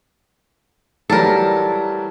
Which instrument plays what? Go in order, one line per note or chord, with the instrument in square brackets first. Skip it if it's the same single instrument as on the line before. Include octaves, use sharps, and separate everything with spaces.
[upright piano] E3 F#3 G3 [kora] A4 A#4